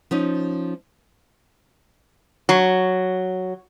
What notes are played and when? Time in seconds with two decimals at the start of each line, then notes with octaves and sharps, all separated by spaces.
0.11 F3 C#4 D#4
2.49 F#3